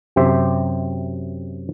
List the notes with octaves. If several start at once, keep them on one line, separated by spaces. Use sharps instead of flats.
F#2 C3 G4 C5 E5